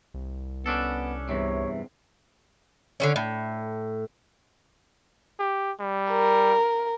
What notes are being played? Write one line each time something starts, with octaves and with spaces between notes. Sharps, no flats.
C2
B3 C#4 D4 A4
E2 G2 C3 C#5
D3 F#3 C#4
A2
G4
G3
A#4